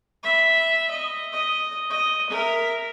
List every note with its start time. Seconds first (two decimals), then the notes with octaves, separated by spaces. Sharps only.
0.23 E5 B5
0.91 D#5
1.33 D#5
1.90 D#5
2.30 A#4 E5